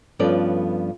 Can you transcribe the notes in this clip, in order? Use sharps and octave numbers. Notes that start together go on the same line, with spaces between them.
G2 F3 B3 C#4 A4 D5